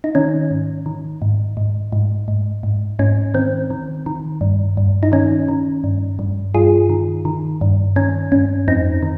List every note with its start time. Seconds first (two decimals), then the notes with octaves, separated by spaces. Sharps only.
0.04 D#4
0.15 D#3 C#4
0.51 G#2
0.86 D#3
1.22 G#2
1.57 G#2
1.92 G#2
2.28 G#2
2.63 G#2
2.99 G#2 C#4
3.34 D#3 C4
3.70 D#3
4.06 D#3
4.41 G2
4.77 G2
5.03 D#4
5.12 D#3 C#4
5.48 D#3
5.84 G2
6.19 G2
6.54 G2 F4 G#4
6.90 D#3
7.25 D#3
7.61 G2
7.96 D#3 C#4
8.32 G2 C#4
8.68 F2 C4 D#4
9.03 D#3